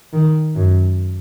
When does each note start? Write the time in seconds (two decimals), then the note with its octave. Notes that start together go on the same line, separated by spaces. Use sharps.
0.13 D#3
0.55 F#2